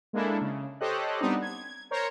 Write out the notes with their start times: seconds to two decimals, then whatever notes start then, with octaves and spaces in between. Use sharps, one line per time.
0.13 G#3 A#3 D4 E4 A4
0.41 C#3
0.80 G4 A4 C5 C#5 D#5 F#6
1.21 G3 B3 C4 D4 D#4
1.42 G#6
1.91 A#4 C5 C#5 A#5